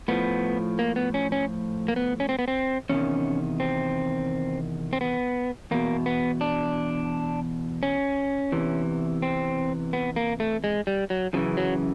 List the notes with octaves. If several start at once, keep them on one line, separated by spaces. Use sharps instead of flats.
A2 F3 B3
A#3
B3
C#4
C#4
A#3
B3
C#4
C4
B3
C4
E2 C3 D#3 C#4
C4
C4
B3
E2 B2 A#3
B3
D4
C#4
E2 C3 E3
C4
B3
A#3
A3
G#3
G3
F#3
F#2 C#3 E3 F3
F#3